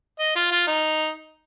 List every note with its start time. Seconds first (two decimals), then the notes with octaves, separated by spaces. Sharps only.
0.19 D#5
0.35 F4
0.51 F4
0.67 D#4